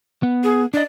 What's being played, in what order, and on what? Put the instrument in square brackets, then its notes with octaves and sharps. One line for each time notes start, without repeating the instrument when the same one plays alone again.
[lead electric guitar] B3
[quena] G#4
[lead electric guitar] D4 D#5 [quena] D5